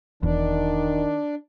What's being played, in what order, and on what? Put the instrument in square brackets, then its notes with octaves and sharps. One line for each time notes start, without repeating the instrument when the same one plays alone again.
[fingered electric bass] E1 E2 [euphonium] D#3 [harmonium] D4